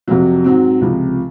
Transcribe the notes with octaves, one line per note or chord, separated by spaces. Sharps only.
F2 C3 F#3
G#2 F#3 C4
C#2 C3 F3